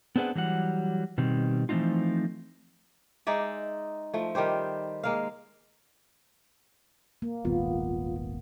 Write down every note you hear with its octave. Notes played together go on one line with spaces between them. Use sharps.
B3 C4 D4 G#4 B4 F#5
E3 F#3 G3 F#5
B2 D#3 G3 C4
E3 F3 A3 C4 D#4 F4
G#3 D#4 D5 E5
F3 A3
D#3 G3 G4 C5
G#3 A#3 F5
A#3
D#1 G#1 B3 F4